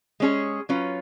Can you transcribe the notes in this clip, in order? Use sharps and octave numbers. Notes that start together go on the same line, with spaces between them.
G#3 C#4 G#4 C#5
F#3 C#4 F4 B4